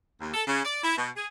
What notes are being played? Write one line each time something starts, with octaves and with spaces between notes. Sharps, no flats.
D#2
A4
C#3
D5
E4
B2
G#4